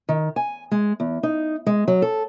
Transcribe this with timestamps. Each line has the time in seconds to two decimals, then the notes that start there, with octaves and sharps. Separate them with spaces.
0.09 D#3
0.36 G#5
0.71 G#3
1.00 E2
1.23 D#4
1.66 G#3
1.88 F#3
2.02 A4